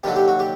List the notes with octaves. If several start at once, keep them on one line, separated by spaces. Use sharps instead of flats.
D#2 D3 F#3 G4
G4
F#4
G4